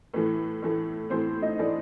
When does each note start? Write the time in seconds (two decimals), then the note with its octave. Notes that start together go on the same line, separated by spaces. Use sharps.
0.14 A2 E3 A3 B4
0.62 A2 E3 A3
1.10 A2 E3 A3 C4 C5
1.42 D#4 D#5
1.59 A2 E3 A3 D4 D5